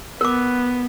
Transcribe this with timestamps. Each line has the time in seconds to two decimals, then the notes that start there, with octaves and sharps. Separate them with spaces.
0.21 B3 A#4 D6